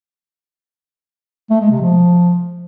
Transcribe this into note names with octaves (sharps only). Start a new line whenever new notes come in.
A3
G#3
C3
F3